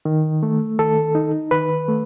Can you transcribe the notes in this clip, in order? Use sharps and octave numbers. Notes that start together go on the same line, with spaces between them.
D#3
A3
D#3 A4
D#4
D#3 B4
A3